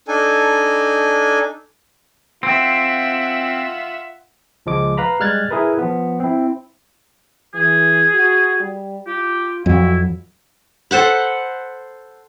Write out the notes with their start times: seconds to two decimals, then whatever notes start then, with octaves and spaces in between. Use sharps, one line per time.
0.08 D4 D#4 A4 G#5
2.43 C4 F4 E5 F#5
4.66 C#2 F3 G#3 D6
4.97 B4 F5 A#5 B5
5.20 G3 G#3 F6 F#6 G#6 A6
5.51 E4 G#4 A#4 B4
5.79 F3 B3
6.20 C4 E4
7.54 E3 G#4
8.14 F#4
8.59 G3
9.07 F4 G4
9.66 F2 F#3 E4 F#4
10.91 A4 C5 F#5 B5